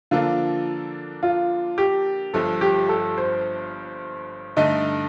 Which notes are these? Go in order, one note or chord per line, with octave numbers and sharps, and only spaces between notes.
D3 F3 A#3 D4 F4 A4
F4
G4
G1 G2 F3 A4
G4
A4
C5
G2 D3 A3 D#4 A4 D#5